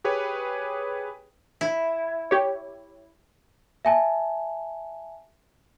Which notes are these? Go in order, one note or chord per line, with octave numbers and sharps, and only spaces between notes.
G4 G#4 B4 C#5 G5
E4
G4 C#5
E5 G#5 A5